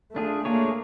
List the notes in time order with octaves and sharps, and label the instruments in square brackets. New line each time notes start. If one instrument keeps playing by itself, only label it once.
[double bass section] A3 [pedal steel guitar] D4 F4 G#4
[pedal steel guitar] A3 D4 F4 G#4 C#5 [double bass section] A#3